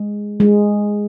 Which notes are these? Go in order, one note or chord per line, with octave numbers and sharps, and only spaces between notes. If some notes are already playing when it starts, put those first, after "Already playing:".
Already playing: G#3
G#3